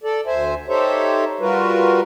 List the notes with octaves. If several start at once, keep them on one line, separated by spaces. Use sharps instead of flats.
A4 D5
D2 C5 E5 G#5
D#4 G4 A4 C5 C#5 E5
G3 F4 F#4 A#4 B4